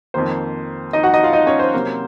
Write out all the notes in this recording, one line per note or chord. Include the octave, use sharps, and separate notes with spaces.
F2 D#3 A#3 C5
D#4 D#5
F#4 F#5
D#4 D#5
F4 F5
D#4 D#5
C#4 C#5
C5
C3 F#3 A#3